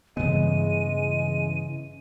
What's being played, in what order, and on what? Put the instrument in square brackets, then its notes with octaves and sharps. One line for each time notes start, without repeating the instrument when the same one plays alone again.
[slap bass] G2 B3 [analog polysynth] C#3 E3 [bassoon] G#3 [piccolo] D#7